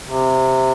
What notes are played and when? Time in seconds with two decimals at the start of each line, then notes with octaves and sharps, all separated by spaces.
0.08 C3